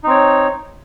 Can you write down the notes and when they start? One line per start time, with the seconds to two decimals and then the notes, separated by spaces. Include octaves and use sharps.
0.04 D#4
0.07 C4
0.10 C#5